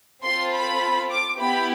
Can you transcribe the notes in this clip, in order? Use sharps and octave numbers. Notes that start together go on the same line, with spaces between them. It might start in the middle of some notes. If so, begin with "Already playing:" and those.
C4 F4 A4 C6
B5
D6
B3 E4 G4 B5